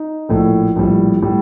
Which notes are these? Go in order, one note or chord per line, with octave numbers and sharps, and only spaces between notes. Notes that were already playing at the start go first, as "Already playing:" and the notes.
Already playing: D#4
A#1 A2 A3
A#1 A2 G3
A2 G3